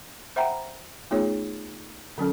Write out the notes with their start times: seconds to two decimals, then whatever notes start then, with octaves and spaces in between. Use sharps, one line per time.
0.36 C5 E5 F#5 G5 A#5 B5
1.11 A3 B3 D#4 F4 G#4 C#5
2.18 D3 F#3 C#4 A4